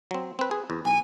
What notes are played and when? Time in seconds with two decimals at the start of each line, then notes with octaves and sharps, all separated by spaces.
0.11 F#3 C4
0.39 C4 B4
0.51 G#4
0.70 E2
0.85 B1 G#5